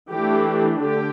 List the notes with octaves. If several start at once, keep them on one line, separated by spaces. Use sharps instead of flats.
E3 A3 D4 G4
D3 G4